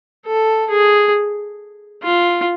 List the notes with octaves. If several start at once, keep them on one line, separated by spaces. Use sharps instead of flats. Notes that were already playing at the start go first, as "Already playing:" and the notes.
A4
G#4
F4